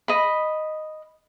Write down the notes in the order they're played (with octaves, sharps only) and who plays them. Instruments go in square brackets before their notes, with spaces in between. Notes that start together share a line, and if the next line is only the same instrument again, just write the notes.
[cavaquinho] D#5 B5